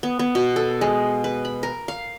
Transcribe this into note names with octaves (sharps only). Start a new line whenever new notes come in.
B3
B3
B2
A4
G#3
B4
B5
A#4
F5